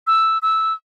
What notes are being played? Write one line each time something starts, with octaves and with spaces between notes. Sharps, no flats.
E6
E6